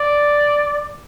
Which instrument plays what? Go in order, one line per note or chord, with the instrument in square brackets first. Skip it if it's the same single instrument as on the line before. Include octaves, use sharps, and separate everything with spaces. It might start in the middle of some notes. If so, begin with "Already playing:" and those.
Already playing: [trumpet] D5